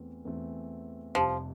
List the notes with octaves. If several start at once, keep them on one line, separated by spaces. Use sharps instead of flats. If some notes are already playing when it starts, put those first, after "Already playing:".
Already playing: E2 E3 A3 C4
E2 E3 A3 C4
F1 F2 C3 F3 G3